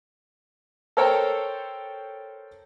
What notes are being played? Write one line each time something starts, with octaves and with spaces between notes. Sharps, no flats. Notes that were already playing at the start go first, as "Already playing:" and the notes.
A4 A#4 C5 C#5 G5 A#5